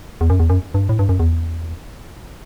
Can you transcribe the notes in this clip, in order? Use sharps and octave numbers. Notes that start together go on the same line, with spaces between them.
E2
F#2
E2
F#2
G2
A2
G2
F#2
E2